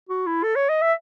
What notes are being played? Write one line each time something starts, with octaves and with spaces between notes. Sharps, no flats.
F#4
E4
A4
C#5
D#5
E5